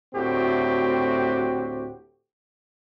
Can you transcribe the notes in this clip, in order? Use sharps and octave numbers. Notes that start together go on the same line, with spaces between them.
D2 A2 C4 F#4 G4